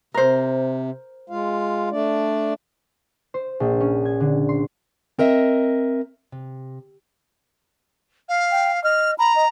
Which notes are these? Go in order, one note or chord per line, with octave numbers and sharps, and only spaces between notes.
C3 A#4 C5
G#3 F4 F5
A3 D4 D5
C5
A#1
C#4
G#6
D3
C6
C4 A#4 D#5 E5
C3
F5
G5
D#5 F6
A#5 B5
D#5